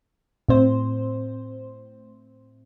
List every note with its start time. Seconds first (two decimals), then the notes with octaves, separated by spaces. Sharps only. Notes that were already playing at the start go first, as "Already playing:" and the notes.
0.48 A2 C4 C5